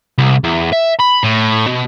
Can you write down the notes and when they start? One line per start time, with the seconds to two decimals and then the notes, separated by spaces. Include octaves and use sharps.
0.18 C2
0.44 E2
0.73 E5
1.00 B5
1.24 A2
1.66 B2